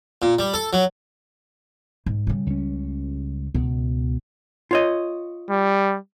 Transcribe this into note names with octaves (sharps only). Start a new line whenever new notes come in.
A#2
G3
A4
F#3
G#2
C#3 G3
C#2 C#4
C#2 B2
F4 C#5 D#5
G3